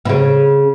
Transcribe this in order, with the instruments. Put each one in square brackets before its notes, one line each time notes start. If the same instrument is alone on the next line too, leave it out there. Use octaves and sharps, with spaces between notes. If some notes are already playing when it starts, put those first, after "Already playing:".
[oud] B2
C#3